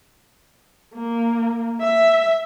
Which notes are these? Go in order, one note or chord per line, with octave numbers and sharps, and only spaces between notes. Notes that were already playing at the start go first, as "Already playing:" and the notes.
A#3
E5